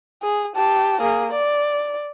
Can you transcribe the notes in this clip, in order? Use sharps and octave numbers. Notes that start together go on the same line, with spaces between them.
G#4
G4 A5
A#3 G#4
D5